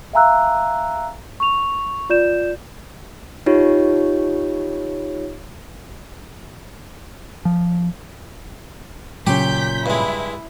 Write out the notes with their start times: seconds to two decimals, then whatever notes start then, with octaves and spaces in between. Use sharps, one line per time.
0.13 E5 F5 G#5 A#5 E6 F#6
1.40 C#6 F7
2.10 F4 D5 G6 E7
3.46 D#4 F4 G4 C#5
7.45 F3
9.27 A#2 C#3 F#3 C#4 G4 G6 B6
9.86 G2 G#3 E4